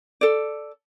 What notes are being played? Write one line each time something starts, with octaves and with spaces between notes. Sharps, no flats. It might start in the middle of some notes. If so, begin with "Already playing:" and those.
A4 D5